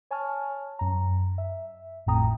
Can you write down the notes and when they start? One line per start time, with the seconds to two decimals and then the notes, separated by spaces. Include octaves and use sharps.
0.11 C#5 G#5 A5 C#6 F6
0.79 F#2 A#5
1.38 E5
2.06 G#1 F2 A2 G5 A#5 D#6